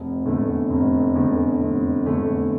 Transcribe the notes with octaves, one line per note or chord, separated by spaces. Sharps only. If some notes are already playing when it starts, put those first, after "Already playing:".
Already playing: F1
E2 D3 A3
F1
E2 D3 A3
F1
E2 D3 A3